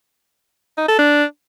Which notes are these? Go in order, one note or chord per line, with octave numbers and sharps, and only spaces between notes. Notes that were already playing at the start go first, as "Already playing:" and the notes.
D#4
A4
D4